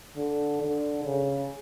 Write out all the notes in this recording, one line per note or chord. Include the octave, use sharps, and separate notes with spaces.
D3
D3
C#3